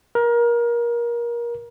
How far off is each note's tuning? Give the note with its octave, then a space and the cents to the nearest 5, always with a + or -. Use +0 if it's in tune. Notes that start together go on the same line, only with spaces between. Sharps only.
A#4 +25